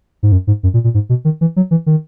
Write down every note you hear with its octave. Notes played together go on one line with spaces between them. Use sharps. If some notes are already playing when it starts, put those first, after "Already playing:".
G#2
F#2
G#2
F#2
A#2
A#2
G#2
B2
D#3
E3
F#3
E3
D#3